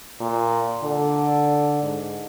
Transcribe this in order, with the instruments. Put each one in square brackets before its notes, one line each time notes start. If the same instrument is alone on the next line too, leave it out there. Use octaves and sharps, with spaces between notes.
[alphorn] A#2
D3
G#2